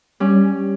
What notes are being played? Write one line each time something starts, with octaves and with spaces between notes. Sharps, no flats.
G3 C#4